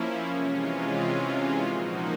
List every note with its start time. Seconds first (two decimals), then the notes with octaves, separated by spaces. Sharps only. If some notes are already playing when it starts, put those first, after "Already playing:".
Already playing: F3 A#3 C#4 E4
0.30 C3 E3 G#3 C#4 F4
1.64 A#2 F3 A#3 D#4 F#4